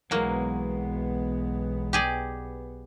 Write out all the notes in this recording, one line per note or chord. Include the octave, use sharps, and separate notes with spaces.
B1 E3 F#3 G#3 A#3 B3
G4 G#4 D5